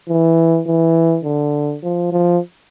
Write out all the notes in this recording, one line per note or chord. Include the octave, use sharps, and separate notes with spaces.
E3
E3
D3
F3
F3